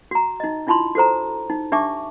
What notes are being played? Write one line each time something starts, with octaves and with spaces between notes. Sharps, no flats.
F#4 A#5
D#4 D#5
D4 E4 F4 A5 B5 C6
F#4 A4 C5 A#5
D#4
D4 G4 E5 A5 C#6 D6